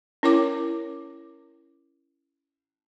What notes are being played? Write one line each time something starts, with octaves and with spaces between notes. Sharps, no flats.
C#4 E4 A#4 C#5 G5 D6